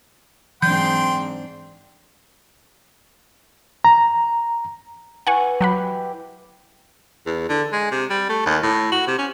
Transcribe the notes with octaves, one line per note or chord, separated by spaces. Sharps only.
G#2 E3 F#3 C4 D4 G5 C6 G6
A#5
E3 F#5 G#5 C#6
F#3 G4 F#5 B5
E2
D3
G#3
C3
G3
A3
D#2
A2
F#4
C3
C#4